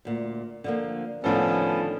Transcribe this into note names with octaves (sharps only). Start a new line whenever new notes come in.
D2 A#2
D3 F3 A#3
A2 D3 D#3 F3 B3 C#4 A4